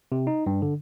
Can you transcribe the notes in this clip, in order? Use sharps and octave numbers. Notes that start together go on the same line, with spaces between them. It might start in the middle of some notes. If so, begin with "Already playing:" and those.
C3
D#4
G2
D3